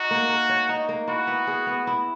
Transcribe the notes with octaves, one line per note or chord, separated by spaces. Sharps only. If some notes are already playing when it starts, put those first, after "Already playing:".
Already playing: D#4 F#4
A#3
A#4
C#5
D#4
A#3
E4 F#4
B3
G#4
B3
E4